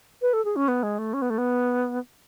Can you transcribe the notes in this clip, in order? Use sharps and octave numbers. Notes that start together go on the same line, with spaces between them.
B4
A4
G#4
C#4
B3
G#3
A3
C#4
B3
A3
B3